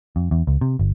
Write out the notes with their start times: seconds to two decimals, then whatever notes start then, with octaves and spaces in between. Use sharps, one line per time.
0.16 F2
0.31 E2
0.47 C#2
0.61 C3
0.79 G1